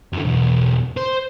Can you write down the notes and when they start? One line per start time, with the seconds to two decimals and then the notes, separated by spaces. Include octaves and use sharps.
0.13 F#2 D3
0.25 B1 E2
0.97 C5